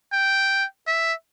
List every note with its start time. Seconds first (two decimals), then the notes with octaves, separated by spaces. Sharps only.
0.13 G5
0.87 E5